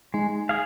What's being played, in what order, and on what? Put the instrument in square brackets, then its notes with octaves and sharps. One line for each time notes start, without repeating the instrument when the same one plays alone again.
[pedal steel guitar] G#3 [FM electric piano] D#4
[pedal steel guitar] G#4 F5